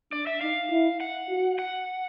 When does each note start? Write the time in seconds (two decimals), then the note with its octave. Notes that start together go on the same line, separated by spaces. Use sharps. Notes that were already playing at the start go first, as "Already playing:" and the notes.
0.12 D4 D5
0.27 E5
0.41 D#4 F5
0.71 E4
1.00 F#5
1.29 F#4
1.59 F#5